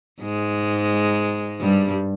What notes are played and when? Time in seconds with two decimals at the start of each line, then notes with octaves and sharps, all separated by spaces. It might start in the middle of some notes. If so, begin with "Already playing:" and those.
0.22 G#2 G#3
1.60 G2 G3